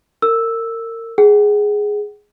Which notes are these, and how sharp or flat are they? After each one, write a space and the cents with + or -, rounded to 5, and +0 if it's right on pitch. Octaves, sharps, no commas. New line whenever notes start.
A#4 -30 E6 +0
G#4 +0 F#5 +40